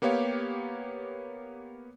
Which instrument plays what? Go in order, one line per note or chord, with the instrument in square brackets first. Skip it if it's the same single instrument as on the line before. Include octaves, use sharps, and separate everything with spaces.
[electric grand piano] A#3 B3 G4 C#5 F5